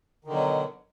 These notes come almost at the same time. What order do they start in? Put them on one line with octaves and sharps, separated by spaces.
D#3 D3 B2 F#3